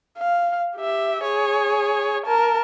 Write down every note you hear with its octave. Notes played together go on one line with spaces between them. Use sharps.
F5
G4 E5
G#4 C#5
A#4 A5